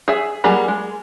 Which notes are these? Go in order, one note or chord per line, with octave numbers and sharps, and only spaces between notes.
G#4 E5
F#3 G3 A#3 G#4 B5
G#3